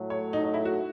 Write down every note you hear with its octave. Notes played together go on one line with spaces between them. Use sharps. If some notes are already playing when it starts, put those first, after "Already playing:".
Already playing: A2 F#3 A3
C#5
D#4
D#4
E4
F#4